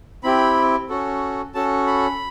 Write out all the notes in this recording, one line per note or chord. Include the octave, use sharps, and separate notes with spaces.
C4 E4 G4 B5
C#4 F#4 A4
C#4 F#4 A4 A5
B5